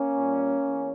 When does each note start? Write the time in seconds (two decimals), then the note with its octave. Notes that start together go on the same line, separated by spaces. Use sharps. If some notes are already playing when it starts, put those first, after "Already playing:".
Already playing: A#3 C#4
0.16 A#2 G3
0.65 E2